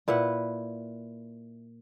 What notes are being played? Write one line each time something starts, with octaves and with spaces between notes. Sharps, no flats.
A#2 E4 B4 F#5